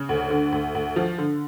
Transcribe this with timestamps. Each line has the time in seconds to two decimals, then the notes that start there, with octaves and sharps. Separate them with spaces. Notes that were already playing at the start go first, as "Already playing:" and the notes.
Already playing: C#3
0.09 D2
0.30 D3
0.52 D2
0.75 D2
0.96 F3
1.18 D3